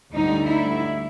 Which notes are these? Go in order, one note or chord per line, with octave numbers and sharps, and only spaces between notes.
D2 D3 G3 D#4
E4